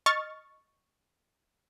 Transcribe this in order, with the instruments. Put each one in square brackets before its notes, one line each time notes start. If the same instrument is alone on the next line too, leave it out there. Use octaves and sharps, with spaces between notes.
[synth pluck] D#5 C#6 F6 A6